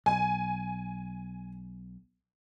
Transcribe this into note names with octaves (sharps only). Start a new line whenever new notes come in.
B1 G#5